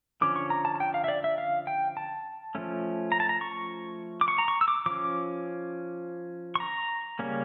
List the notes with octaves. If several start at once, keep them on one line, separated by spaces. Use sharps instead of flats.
D3 F3 C#4 D6
C#6
A#5
A5
A5
G5
F5
E5
D5
E5
F5
G5
A5
F3 A3 C#4
A#5
A5
A#5
C#6
D6
C#6
A#5
C#6
E6
D6
F3 C#4 D6
C#6
A#5
C#3 G3 A#3 C#4